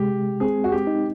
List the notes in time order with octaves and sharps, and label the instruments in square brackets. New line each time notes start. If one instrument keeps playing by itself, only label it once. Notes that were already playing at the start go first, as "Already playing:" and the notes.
Already playing: [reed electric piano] C3 G#3 [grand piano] G4
[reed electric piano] C4 [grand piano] G#4
[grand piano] F#4
G4
[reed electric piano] D#4